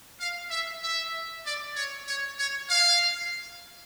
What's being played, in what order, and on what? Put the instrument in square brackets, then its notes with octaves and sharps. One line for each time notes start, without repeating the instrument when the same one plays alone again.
[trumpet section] F5
E5
E5
D5
C#5
C#5
C#5
F5